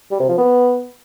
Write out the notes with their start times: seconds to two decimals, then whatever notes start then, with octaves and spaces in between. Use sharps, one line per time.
0.11 G3
0.20 C3
0.29 F3
0.38 B3